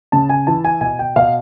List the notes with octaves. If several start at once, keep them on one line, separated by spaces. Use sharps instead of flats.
C#3 A5
G#5
E3 A5
G#5
B2 G#5
G5
B2 F5